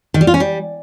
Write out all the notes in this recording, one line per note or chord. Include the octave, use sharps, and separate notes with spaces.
D#3
G3
F4
C#4
G3